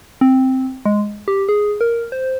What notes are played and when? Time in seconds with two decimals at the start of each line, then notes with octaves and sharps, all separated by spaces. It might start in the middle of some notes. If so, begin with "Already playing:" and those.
0.21 C4
0.85 G#3
1.28 G4
1.49 G#4
1.81 A#4
2.12 C5